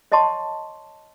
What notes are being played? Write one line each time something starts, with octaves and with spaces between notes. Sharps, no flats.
C#5 D#5 F#5 A5 C6 C#6